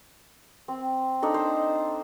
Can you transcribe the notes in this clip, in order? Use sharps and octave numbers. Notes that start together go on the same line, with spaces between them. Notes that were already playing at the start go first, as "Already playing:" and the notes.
C4
D4 D#4 A4
C5